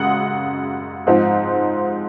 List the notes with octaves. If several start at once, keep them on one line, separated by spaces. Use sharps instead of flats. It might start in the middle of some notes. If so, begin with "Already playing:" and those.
Already playing: F#2 C#3 G#3 F#5 D#6
G#2 F3 C4 D#4